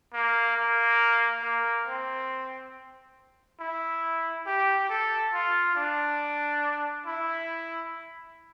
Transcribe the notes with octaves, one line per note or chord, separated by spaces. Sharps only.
A#3
A#3
A#3
C4
E4
G4
A4
F4
D4
E4